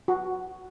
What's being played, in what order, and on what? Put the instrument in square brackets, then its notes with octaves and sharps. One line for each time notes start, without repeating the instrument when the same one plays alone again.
[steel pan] F#4